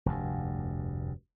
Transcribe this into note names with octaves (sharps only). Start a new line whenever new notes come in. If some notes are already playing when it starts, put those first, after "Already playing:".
F1 D2 G2